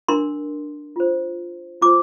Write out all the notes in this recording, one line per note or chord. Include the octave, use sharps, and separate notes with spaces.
D4 A#4 C6
F4 C5
F4 C5 D6